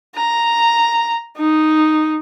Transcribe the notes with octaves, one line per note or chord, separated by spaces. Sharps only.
A#5
D#4